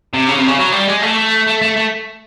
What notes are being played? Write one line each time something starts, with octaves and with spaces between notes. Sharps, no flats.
C3
C#3
C3
C#3
F#3
G3
G#3
A3
A3
A3
A3